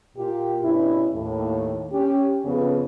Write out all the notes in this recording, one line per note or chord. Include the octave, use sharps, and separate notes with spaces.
A#2 F4 G4
G2 B2 C#4 E4
D#2 A2
C#4 G4
F2 C#3 F3 B3